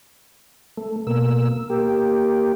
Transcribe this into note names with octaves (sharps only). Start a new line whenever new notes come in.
A3
B2 A#3 E6
A#3 G4